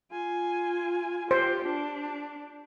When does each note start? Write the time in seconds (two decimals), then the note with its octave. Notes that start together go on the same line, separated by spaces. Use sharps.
0.11 F4 G#5
1.31 F4 G4 C5
1.65 D4